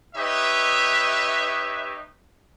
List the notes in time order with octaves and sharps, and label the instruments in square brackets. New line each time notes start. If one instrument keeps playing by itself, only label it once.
[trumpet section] D#4 G4 B4 C#5 D#5 E5